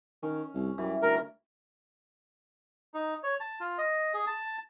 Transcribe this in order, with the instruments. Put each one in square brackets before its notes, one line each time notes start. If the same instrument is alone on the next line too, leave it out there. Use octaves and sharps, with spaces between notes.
[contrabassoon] D#3 [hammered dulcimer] C#4
[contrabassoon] C2
[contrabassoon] F#2 [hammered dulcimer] E3 G3
[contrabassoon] D2 [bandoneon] A#4
[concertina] D#4
C#5
A5
F4
D#5
G#4
A5